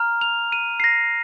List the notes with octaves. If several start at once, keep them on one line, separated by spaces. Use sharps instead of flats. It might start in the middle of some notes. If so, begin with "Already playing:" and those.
Already playing: A#5 F6
F7
D#7
C7
A#6